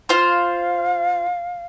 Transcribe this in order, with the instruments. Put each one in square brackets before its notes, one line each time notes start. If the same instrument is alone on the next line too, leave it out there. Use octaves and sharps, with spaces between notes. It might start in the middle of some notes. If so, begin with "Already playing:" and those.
[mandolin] F4 C5 [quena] F5